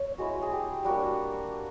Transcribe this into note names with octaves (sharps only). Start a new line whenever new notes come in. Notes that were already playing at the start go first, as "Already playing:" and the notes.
Already playing: C#5
G#3 B3 E4 F#4
G#4
G4
G3 A#3 D4 F#4